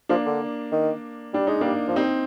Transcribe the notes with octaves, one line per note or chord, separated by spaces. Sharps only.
F3 A#3 D4
D3
D#3
G3 D4
G#3 D#4
G3 A#3 D4
F3
G3 C4 D#4